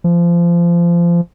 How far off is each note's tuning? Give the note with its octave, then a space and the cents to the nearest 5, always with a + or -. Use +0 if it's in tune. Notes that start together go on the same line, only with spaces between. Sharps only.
F3 -25